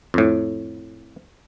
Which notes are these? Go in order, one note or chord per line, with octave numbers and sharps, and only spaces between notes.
F2 A2